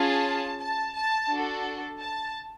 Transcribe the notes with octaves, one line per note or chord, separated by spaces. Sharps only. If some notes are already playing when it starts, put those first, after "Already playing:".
Already playing: C#4 F4 G#4 A5
A5
A5
D4 F#4 A4
A5